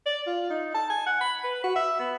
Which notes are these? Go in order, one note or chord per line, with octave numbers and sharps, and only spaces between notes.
D5
F4
D#4
A5
G#5
F#5
B5
B4
F#4
E5
B3